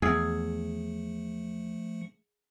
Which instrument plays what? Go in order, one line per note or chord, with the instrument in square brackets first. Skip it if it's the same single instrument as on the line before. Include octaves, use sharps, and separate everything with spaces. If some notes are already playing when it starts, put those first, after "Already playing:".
[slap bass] E2 [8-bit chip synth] F3 A3 C#7 [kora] G#4